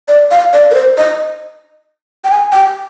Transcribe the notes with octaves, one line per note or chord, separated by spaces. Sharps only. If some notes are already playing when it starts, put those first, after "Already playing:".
D5
F5
D5
A#4
C5
D#5
G5
G#5
G5